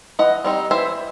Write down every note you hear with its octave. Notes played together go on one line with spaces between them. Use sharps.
E3 D#5 F#5
G3 C4 D#4
E3 C5 E5